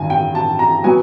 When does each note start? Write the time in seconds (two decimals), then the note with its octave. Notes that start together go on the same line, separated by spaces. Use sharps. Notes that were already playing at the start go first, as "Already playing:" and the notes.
Already playing: G2 D#3 G#5
0.10 G5
0.35 A5
0.59 A#5
0.84 B2 F#3 B3 G#5